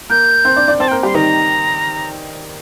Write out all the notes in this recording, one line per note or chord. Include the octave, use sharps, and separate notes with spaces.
A#3 A#4 G6
C4 C5
D4 D5
D4 D5
C4 C5 A5
G5
A#3 A#4
G3 G4 C6
D#3 D#4 A#5